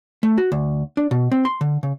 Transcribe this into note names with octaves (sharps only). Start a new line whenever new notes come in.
A3
F#4
D2
D4
B2
C4
C6
D3
C#3